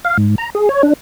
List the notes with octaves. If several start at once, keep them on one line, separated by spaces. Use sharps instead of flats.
F5
G#2
A#5
G#4
C#5
D4